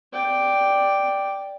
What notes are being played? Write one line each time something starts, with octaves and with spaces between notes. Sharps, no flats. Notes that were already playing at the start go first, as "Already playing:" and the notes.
D5 G5